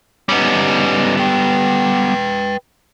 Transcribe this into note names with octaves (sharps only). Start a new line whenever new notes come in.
G3 B3 C#4 D#4
B4 G5